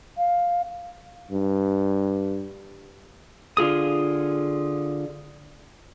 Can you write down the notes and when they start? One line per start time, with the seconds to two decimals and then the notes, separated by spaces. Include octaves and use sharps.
0.18 F5
1.31 G2
3.57 D3 F4 G#4 D#6